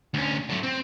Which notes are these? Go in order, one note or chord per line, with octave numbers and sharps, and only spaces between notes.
D2 C#4
A2 F#3
C4